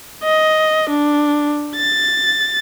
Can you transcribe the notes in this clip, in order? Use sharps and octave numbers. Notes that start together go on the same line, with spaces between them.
D#5
D4
A6